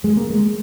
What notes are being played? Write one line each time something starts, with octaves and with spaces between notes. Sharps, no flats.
F#2 G#3
C#3 A#3
G#3